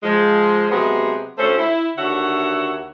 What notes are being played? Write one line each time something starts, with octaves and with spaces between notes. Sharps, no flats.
F3 G#3
C3 F#3 G#3 B3 G4 G#4
D2 A3 C#4 A4 C5
E4
D#2 D3 F#4 C#5 E5 F#5